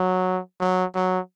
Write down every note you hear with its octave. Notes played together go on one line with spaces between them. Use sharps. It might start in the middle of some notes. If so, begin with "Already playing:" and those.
Already playing: F#3
F#3
F#3